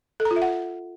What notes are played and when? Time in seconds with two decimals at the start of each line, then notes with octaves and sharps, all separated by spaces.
0.20 A4
0.25 A#5
0.31 F4
0.36 E5
0.42 F#5